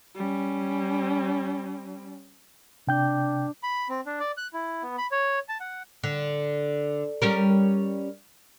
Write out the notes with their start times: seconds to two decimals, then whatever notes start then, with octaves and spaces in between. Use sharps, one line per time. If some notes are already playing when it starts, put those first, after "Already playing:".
0.16 G3 C#4
2.87 C3 D4 G5 G6
3.63 B5
3.89 C4
4.06 D4
4.20 D5
4.37 F#6
4.54 E4
4.83 B3
4.98 B5
5.11 C#5
5.49 A5
5.60 F#5
6.04 D3
7.22 G3 C#4 A#4